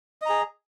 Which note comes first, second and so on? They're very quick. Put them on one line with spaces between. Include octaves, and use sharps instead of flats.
D#5 A#5 G#4